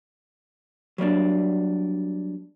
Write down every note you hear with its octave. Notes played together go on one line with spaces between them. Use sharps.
F#3 G3 A#3 D4